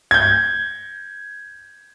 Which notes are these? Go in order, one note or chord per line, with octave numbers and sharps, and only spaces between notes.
G6 G#6